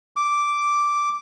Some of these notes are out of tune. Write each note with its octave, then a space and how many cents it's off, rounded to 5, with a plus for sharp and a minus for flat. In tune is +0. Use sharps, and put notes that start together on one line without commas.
D6 -5